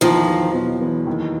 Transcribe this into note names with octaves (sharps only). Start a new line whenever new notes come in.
E2 D#3 F3
F#3
B2
E2
D#2